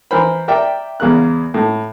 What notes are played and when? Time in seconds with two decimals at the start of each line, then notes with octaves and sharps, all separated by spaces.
0.11 E3 A#4 C5 B5
0.48 A#4 D5 E5 G5
1.00 E2 C#3 A#4 F#6
1.54 A2